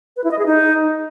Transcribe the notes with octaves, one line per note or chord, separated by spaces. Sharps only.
B4
E4
D#5
G#4
D#4